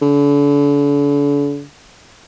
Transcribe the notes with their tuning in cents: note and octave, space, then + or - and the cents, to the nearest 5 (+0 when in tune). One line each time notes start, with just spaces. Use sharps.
D3 -40